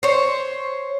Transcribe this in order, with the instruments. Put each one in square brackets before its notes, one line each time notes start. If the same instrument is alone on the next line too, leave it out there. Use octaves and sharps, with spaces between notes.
[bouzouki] C5 C#5